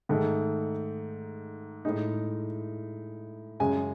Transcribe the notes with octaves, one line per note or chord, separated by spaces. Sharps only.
G#2 D#3 A3 D#4
A2 G#3 D#4
F#2 C#3 G#3 G#5